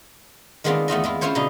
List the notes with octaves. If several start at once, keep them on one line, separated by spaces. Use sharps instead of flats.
D#3 G#3 B3 C4 D4 F4
E2 A3 F4 D#5
G#3 E4 F4
C#4 E4 F4 C5 C#5
B2 D3 D#4